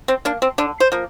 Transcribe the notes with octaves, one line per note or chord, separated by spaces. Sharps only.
C4
A#3 D4
C4
D3 D4
C5
F3 A#3